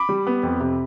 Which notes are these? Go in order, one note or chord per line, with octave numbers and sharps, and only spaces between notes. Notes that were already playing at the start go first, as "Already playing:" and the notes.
Already playing: B5 D6
G3
B3
F2
C3